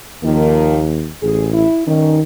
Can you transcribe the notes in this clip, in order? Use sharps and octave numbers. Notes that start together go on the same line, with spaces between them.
D#2 D#3 F3 A#3
A1 G#4
E4
G2 D#3 C#4 D#4